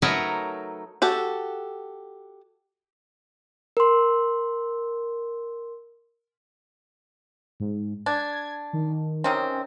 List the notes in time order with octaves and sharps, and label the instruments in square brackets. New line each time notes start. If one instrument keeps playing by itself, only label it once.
[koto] F#3 A3 D#4 A#4 B4 C#5
[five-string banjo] F#4 G4 A4
[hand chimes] A#4 C6
[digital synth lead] G#2
[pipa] D4 [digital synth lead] G#6
[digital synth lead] D#3
[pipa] C3 D#3 C4 [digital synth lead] C#4